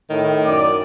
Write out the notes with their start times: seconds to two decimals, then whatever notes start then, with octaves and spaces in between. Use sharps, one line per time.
0.10 A2 D#3
0.46 F#2 D5